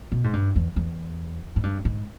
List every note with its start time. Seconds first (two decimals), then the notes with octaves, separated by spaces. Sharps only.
0.12 B2
0.24 G#2
0.33 G2
0.56 E2
0.76 E2
1.56 G#2
1.63 G2
1.85 G#2